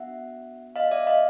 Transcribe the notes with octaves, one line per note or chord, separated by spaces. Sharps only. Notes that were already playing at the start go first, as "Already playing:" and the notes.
Already playing: B3 D4 F#4 E5 F#5
D#5 F5
D5 E5
D#5 F5